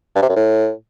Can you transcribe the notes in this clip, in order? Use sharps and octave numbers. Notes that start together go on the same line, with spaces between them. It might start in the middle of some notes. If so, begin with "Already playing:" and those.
G2
C3
F#2
A2